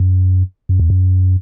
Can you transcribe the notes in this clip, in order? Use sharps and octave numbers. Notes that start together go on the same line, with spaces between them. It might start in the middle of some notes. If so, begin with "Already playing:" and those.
Already playing: F#2
F#2
E2
F#2